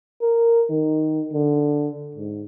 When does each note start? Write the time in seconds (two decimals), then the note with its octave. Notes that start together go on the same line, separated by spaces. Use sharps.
0.21 A#4
0.70 D#3
1.33 D3
2.15 G#2